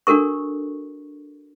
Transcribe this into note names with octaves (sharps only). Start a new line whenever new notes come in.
D4 F#4 A4 A#4 C#6